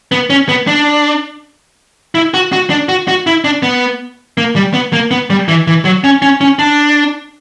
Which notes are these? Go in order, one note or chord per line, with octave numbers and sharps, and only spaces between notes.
B3
C#4
B3
D4
E4
F#4
F#4
D4
F#4
F#4
E4
D4
B3
A#3
G3
B3
A#3
B3
G3
E3
E3
F#3
C#4
C#4
C#4
D4